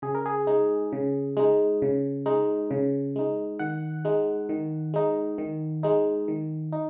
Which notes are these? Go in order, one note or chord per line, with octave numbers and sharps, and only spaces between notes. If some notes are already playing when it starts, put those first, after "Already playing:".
C#3 G#4
A#4
G#4
G#3 D#4
C#3
G#3 D#4
C#3
G#3 D#4
C#3
G#3 D#4
D#3 F#5
G#3 D#4
D#3
G#3 D#4
D#3
G#3 D#4
D#3
D#4